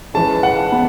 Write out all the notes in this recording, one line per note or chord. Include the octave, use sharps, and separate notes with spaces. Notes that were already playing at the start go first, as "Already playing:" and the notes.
E3 G#3 C#4 A5
F#5
B3